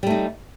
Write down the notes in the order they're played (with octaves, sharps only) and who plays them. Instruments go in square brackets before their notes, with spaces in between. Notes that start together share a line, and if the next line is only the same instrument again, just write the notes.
[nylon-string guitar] G3
A3
D#4